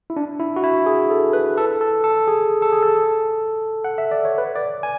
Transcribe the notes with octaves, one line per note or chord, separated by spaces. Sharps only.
E4
D4
E4
F#4
E4
G#4
A4
B4
A4
A4
A4
G#4
A4
G#4
A4
F#5
E5
D5
C#5
B4
D5
G#5